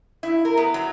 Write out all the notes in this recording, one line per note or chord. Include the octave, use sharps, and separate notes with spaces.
E4
A#4
B3
F#3